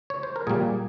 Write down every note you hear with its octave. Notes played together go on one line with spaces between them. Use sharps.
C#5
C5
A#4
A#2 G3 A#3 G#4